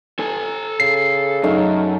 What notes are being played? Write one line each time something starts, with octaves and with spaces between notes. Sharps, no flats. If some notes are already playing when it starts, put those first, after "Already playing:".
A4 G#5
C#3 C7
F#2 A3 D#4 E5